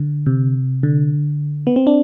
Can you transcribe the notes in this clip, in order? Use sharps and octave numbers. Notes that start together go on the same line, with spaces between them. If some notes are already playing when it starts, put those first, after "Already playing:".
Already playing: D3
C3
D3
B3
C4
D4